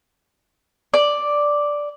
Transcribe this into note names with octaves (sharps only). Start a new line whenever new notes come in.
D5